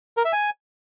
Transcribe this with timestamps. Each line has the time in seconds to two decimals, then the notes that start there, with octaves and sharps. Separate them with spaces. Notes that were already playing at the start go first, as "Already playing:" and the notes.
0.17 A#4
0.25 E5
0.33 G#5